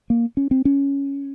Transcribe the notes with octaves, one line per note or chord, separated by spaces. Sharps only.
A#3
C#4
C4
C#4